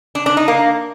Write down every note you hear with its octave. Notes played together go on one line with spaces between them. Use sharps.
D4
D4
D#4
A#3